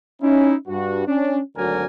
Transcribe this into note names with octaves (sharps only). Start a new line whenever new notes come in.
C#4 D#4 E4
G2 F#4
C#4 D4
G#1 D2 F#3 A#4 D5 G#5